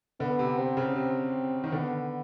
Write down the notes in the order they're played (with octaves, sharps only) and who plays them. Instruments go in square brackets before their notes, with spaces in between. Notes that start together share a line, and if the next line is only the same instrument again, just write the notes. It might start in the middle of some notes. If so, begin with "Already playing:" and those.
[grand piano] D3 [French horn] B3
[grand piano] C3
[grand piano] C3 [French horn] C4
[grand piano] C#3
[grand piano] C3 [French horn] C4
[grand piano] D#3
[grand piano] D3 [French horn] B3